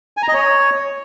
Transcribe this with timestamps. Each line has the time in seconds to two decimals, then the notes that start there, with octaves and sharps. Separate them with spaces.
0.17 G#5
0.23 A#5
0.28 D#5
0.34 C#5